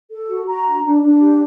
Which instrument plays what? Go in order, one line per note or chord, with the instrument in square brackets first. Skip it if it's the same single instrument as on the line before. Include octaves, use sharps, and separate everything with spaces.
[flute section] A4
F#4
F#4 A#5
D4
D4
D4
G4